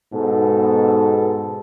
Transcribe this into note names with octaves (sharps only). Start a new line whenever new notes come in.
G#2 B2 B3 A4